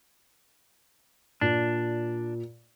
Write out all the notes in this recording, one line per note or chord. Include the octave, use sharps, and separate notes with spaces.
A#2 D4